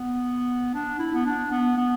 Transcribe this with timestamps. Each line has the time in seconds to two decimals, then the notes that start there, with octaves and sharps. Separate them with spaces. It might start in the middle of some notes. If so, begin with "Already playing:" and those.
Already playing: B3
0.74 D4
0.99 E4
1.14 B3
1.26 D4
1.51 B3
1.77 B3